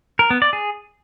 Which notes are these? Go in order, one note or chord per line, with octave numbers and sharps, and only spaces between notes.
A#4
B3
D5
G#4